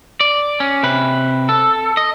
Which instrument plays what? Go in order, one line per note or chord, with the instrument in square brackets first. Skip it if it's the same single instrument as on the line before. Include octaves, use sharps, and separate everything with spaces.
[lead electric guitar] D5
C#4
C3 B4
A4
D#5